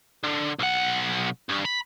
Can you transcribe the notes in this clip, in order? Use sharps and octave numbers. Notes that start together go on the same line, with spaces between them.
D3
B1 F#5
G2
B5